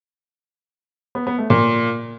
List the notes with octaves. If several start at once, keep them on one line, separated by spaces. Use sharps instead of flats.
B3
B3
A3
A#2